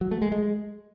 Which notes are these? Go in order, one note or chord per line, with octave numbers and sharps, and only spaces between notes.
F#3
A3
G#3
G#3